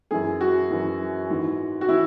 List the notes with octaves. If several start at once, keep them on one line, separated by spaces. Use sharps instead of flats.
F#2 E3 G#4
F#4
F#2 E3
G#2 E3
F#4
E3 E4